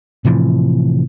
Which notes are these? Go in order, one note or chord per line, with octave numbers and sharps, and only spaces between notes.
A2 C3 E3 F3